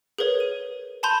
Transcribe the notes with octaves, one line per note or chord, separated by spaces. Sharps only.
G#4 A#4 B4 C#5
D#7
G#5 A5 B5 C6 G6 F7